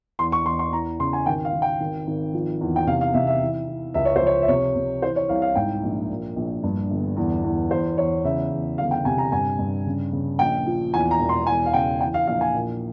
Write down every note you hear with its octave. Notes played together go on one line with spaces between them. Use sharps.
E2 C6
C#6
E2 C6
C6
E3 A#5
C#3 C6
G#5
G#1 G5
F5
G#1
G5
G#1
G#1
F3
E2
G5
C3 F5
F5
C3 E5
E5
E3
E3
C#2 E5
C#5
C5
F3
C#5
E5
C3 C#5
C3
E3 C5
C#5
C2 F5
F5
G#2 G5
A#1
A#2
A#1
G2
G1
E2
E2
E2 C5
E2 C#5
C#3 E5
E2
G1 F5
G5
C3 G#5
A#5
G2 G#5
G2
C#3
C#3
A#1 G5
F3
E2 G#5
A#5
E1
C6
E2 G#5
F5
C#3 G5
E3 G5
F5
A#1 F5
G#5
A#2